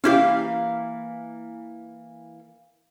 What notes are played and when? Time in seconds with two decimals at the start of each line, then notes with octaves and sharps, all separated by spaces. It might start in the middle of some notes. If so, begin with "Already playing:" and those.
0.04 E3 A#3 C#4 E4 G4 F5